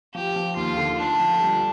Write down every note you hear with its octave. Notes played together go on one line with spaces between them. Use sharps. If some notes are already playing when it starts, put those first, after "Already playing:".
F3 G4
F3
D#2 F4
D3
A3 D4
F3
G3